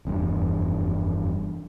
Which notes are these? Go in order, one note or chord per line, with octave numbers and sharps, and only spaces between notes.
F1 E2 G2